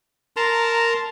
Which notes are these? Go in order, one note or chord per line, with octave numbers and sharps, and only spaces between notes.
A#4 A5 A#5 C6